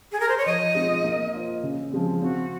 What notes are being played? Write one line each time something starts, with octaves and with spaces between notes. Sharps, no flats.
G#4
A#4
C5
C#5
F3 D#5
G#3 C4 F4
A#3
F4 C5 D#5
C#3
F3 G#3 C4
C4 F#4